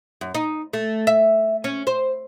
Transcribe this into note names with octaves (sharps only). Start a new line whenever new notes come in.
F#2
D#4
A3
E5
C#4
C5